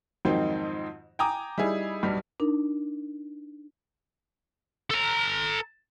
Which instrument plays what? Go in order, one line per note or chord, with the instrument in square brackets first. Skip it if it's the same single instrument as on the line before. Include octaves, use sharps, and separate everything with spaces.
[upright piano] F2 G#2 D#3 F#3 C4 D#4
G5 G#5 A#5 D6 D#6
G3 D#4 E4 G#4
B1 G2 G3
[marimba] D4 D#4 A#4
[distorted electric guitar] A4 A#5